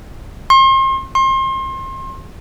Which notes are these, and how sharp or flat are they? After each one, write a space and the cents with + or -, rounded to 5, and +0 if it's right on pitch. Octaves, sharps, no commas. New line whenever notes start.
C6 +40
C6 +35